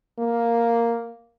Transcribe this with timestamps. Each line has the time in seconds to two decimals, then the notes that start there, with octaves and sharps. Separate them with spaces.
0.19 A#3